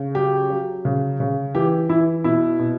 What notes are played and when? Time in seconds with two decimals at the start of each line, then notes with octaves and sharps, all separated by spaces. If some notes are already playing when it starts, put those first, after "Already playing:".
Already playing: C#3
0.15 F#3 G4
0.50 F#3
0.85 C#3
1.20 C#3
1.55 E3 G4
1.89 E3 E4
2.24 B2 E4
2.59 B2